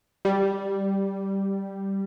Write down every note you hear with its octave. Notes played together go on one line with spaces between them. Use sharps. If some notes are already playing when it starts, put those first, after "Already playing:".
G3